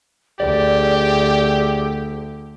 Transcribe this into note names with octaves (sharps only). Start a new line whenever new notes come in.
D2 G4 G#4 D5